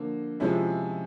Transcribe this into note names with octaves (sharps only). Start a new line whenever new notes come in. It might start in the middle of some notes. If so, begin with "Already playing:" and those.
Already playing: D3 F3 A#3
C3 F3 G#3 C#4 E4